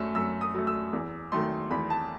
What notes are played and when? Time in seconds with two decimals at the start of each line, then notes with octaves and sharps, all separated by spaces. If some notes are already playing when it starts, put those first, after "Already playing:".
Already playing: F#2 F#3 A3 E6
0.15 F#2 E6
0.41 D#6
0.55 F#3 A3
0.67 E6
0.93 E2
1.32 D#3 F#3 A3 C6
1.71 E2 B5
1.90 A5